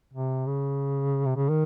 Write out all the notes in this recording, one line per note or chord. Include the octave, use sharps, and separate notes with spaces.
C3
C#3
C3
C#3
D#3